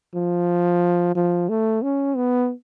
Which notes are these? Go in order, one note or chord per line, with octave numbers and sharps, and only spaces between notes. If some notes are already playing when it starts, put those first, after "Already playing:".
F3
F3
A3
C#4
B3